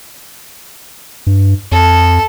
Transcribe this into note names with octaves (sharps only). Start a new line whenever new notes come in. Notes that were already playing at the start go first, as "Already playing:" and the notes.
G2
F2 A4